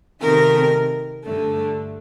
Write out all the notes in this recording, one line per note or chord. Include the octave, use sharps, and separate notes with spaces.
C3 D#3 A3 A#4
G2 D3 A3